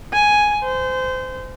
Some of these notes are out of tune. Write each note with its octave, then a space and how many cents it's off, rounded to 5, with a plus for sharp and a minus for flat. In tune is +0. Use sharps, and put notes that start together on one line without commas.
G#5 +5
C5 -25